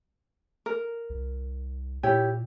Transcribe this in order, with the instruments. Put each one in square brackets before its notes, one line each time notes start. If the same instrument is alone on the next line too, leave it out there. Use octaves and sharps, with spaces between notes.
[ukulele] A#4
[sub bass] C2
[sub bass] A#2 [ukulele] E4 G4 C#5